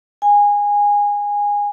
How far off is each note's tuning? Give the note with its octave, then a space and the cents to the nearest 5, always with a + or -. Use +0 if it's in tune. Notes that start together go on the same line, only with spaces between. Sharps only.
G#5 -20